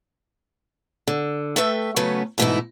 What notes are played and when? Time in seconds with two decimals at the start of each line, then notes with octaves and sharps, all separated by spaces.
1.07 D3
1.56 A3 A4 B4 E5 G5
1.96 C#3 F#3 A3 B3 C#4 B4
2.38 G#2 B2 E3 A3 D#4 E4